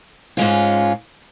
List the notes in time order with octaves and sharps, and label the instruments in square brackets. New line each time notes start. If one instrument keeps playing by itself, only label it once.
[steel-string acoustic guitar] G#2 G#3 C#4 F4